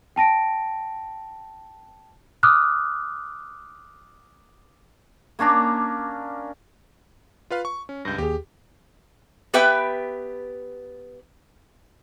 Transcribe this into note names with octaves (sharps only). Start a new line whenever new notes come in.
G5 A5 A#6 D7
D6 D#6 F6 F#6
A#3 C#4 D4 A#5
F4 B4 F5
C#6
C#4
C#2 G2 G6 A#6
D#2 G4 G#4
B3 G4 B4 E5 G5